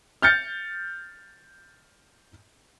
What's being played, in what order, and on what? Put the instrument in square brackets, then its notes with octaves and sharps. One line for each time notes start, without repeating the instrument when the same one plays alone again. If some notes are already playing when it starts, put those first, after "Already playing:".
[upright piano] F6 G6 A6 C#7